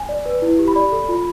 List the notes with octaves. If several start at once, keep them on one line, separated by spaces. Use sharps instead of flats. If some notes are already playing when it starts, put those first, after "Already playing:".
Already playing: G#5
D5
B4
E4
G4
B5
D5
A4
F4